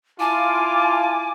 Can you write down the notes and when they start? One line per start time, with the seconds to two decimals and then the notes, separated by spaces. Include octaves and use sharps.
0.20 E4 F4 G#5 A5 D6